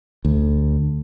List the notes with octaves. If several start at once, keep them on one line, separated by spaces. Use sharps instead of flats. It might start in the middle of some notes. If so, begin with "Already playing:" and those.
D2